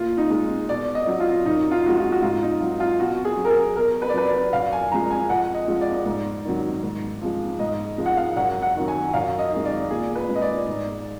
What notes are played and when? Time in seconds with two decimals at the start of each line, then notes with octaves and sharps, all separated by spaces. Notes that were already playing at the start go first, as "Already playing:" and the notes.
Already playing: A#2 F4
0.17 D#4
0.30 G#3
0.69 B2 D5
0.95 D#5
1.07 F#3
1.20 F4
1.46 F#2 D#4
1.71 F4
1.85 F3 G#3 F#4
1.97 F4
2.12 F#4
2.22 G#2 F4
2.42 D#4
2.61 F#3 F4
2.80 F4
2.99 B2 F#4
3.25 G#4
3.37 F#3
3.45 A#4
3.50 G#4
3.76 B2 A#4
4.02 B4
4.09 D5
4.14 F#3 B4
4.28 D5
4.53 F#2 F5
4.73 G#5
4.91 F3 G#3 A#5
5.11 G#5
5.30 F2 F#5
5.55 D#5
5.68 F3 G#3
5.81 D5
6.06 G#2
6.45 D#3 F#3
6.83 G#2
7.21 F3 G#3
7.59 G#2 D#5
7.98 F3 G#3
8.06 F#5
8.17 F5
8.36 F#2 F#5
8.62 F#5
8.76 D#3 F#3
8.88 G#5
9.14 F#2 F5
9.39 D#5
9.51 D#3 G#3
9.65 D5
9.90 A#2 G#4
10.15 B4
10.29 G#3
10.36 D#5
10.42 D5
10.67 G#2